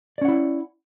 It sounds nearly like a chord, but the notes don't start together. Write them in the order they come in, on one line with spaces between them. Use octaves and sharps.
D5 C#4 F#5 E4